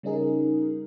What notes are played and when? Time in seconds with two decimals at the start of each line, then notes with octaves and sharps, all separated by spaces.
0.03 C#3 G3 C#4 D#4 G#4 A#4